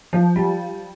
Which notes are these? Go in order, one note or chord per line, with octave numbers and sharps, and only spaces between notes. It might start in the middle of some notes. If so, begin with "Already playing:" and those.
F3
G3